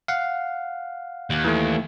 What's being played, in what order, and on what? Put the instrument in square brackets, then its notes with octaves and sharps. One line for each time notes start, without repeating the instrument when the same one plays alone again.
[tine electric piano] F5 F#5
[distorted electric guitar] D#2
[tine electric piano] E3 A3